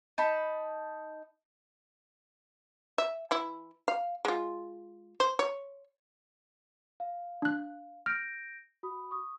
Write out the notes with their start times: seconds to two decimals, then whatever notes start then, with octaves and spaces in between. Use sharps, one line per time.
0.18 D#4 A5 B5
2.98 E5
3.31 E3 E4
3.88 F5
4.25 G#3 F4
5.20 C5
5.39 C#5
7.00 F5
7.42 D4 F#6
8.06 F6 G6 A#6 D7
8.83 F#4 B5 D#6
9.11 C#6 D#6